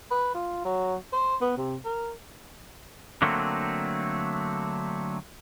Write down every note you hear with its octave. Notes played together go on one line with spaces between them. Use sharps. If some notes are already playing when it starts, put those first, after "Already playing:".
B4
F4
F#3
C5
B3
C3
A#4
D3 F#3 A3 A#3 C4